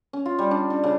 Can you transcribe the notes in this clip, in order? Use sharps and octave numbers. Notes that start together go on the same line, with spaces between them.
C#4
F4
G3
D4
D4
C#3